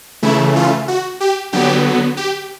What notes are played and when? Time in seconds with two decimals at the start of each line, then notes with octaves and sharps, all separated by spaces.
0.22 C#3 E3 A3 E4
0.56 F4
0.88 F#4
1.20 G4
1.53 D3 F#3 B3 G4
2.17 G4